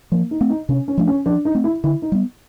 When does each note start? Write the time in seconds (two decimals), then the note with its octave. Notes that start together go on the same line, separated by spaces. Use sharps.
0.12 F3 A#3
0.31 D#4
0.41 A3 C4
0.49 D#4
0.69 C3 C#4
0.88 C#4
0.98 F3 A3 D4
1.07 C#4
1.26 F3 D4
1.45 D#4
1.55 A3 C4
1.64 E4
1.84 D3 E4
2.02 D#4
2.12 G3 B3